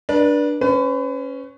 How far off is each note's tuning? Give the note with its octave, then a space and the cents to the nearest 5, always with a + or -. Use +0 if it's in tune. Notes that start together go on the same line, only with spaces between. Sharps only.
D4 +0 B4 -35
C#4 +0 B4 +35